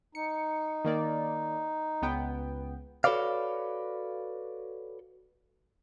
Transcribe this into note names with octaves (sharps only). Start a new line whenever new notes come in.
D#4 C#7
D#3 A#3 D5
C#2 B3 G5
F#4 A4 B4 C#5 D5 F5